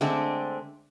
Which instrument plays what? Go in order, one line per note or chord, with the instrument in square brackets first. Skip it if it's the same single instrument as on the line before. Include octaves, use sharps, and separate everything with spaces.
[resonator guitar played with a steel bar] D3 G#3 A3 C4